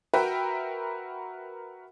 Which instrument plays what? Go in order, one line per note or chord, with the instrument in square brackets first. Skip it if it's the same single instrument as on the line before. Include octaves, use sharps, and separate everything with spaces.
[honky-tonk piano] F#4 A#4 B4 E5 G5